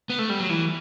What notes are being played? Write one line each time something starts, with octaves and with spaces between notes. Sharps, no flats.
B3
A3
G3
F#3
E3